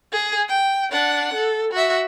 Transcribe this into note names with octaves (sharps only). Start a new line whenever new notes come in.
G#4
G5
D4 F#5
A4
F#4 E5